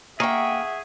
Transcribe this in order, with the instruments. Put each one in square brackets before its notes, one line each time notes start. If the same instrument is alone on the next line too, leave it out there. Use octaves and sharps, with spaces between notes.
[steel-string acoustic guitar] A#3 G5 [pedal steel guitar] G#4 C#6 [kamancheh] E5 F#5